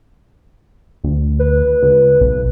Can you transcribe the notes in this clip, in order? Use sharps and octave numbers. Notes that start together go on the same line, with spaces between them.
D2
B4
C#2
B1